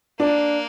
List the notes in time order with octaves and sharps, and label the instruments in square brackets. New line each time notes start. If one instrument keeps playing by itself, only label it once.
[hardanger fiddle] A#3 [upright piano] D4